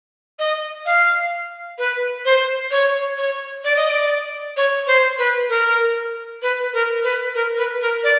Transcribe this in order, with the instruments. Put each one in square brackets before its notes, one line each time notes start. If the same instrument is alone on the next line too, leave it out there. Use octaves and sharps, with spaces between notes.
[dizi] D#5
F5
B4
C5
C#5
C#5
D5
D#5
D5
C#5
C5
B4
A#4
B4
A#4
B4
A#4
B4
A#4
D5